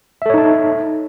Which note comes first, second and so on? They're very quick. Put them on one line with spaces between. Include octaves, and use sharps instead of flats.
E5 A4 C#5 D#4 A5